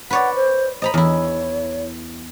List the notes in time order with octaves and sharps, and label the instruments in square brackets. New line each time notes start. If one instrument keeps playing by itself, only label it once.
[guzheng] B4 C#5 D5 [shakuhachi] F#5
[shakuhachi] C5
[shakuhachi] C5 [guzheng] D#5 A#5 B5
[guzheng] E2 E4 [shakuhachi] C#5